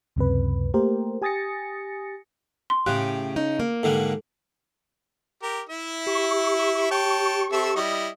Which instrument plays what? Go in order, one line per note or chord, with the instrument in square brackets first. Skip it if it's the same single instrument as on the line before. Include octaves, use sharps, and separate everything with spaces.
[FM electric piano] C#2 F#2 C3 B4
A3 A#3 G4 A#4 C5
G4 G#5 D#6 A6 A#6 C#7
[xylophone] C6
[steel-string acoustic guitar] A2 G4 [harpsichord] C#3 [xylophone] F#6
[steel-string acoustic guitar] C#4 D#4
A#3
[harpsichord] G#2 D3 G3 [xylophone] A4
[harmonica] G4 A#4
E4 E5
[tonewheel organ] G4 C#6
[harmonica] C#5 G5 A5
C4 A4 E5
G3 E4 D#5